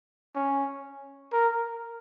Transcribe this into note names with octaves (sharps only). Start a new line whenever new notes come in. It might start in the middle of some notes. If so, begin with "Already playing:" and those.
C#4
A#4